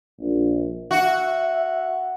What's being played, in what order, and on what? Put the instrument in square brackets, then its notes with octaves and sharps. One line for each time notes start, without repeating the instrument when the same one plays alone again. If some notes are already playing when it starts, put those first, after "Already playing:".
[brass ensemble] A#1
[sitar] F#4 [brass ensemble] E5